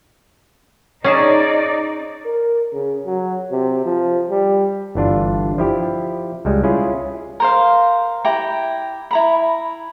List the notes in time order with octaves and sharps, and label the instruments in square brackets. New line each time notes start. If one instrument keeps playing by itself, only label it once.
[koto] C#4 G#4 A5 [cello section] D#4 D5
[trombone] A#4
C#3
F#3
C3
F3
G3
[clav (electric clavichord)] G1 E3 D4 F4
F3 E4 G4
C#2 G3 G#3
C#4 E4 F4 G#4
[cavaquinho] A#4 C5 F5
E4 G4 G5 A#5
E4 A#5 B5